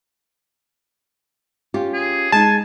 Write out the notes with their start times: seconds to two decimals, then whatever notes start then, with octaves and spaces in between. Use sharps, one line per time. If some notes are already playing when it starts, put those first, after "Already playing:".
1.74 C#4 F4 G4
1.93 G#4
2.32 G#3 D#4 G#5 A5